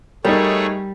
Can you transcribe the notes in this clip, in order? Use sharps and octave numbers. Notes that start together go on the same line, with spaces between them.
G3 A3 D#4 G#4 A#4 C#5